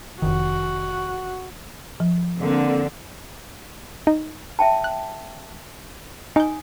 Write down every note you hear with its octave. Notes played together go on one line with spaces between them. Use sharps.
F1 B1 D#3 F#4
F3
D3 A#3 C4
D#4
E5 G5 A5
F#6
D#4 G#5 D#6 G6